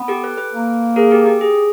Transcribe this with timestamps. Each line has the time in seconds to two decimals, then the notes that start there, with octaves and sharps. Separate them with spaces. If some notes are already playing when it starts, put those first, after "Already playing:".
Already playing: B3
0.08 G4 A4
0.24 A4 B4
0.37 A4 B4
0.53 A#3
0.96 G#4 A#4
1.11 G4 A4
1.26 G4
1.41 G#4